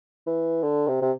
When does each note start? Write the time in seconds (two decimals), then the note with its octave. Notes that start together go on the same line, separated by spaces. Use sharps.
0.27 E3
0.63 D3
0.88 C3
1.02 C3